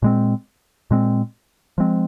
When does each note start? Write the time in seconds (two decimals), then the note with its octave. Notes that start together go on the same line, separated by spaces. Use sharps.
0.02 A#2 G#3 C4
0.91 A#2 G#3 C4
1.78 F3 G#3 C4